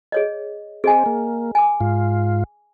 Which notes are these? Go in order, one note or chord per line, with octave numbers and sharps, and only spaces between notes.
G#4 C#5 D#5
C4 G#4 D#5 G#5
A#3
G#5 D6
G#2 F4